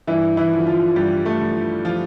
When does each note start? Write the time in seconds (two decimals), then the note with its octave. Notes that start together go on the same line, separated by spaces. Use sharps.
0.07 G2 E3 E4
0.37 E3 E4
0.52 D3 F3
0.67 F3 F4
0.96 G2 G3 G4
1.26 A3 A4
1.41 D3 F3
1.85 F3 F4